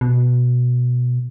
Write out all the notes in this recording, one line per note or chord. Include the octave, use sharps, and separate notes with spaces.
B2